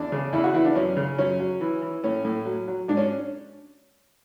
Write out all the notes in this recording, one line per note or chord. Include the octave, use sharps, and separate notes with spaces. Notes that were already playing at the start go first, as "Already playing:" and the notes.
Already playing: E2 D4
C#3
E2 E4
F#4
E3 E4
D4
F#2 C#4
C#3
F#2 C#4
F#3
E3
E3
A2 C#4
A2
F#3
F#3
G#2 D4
C#4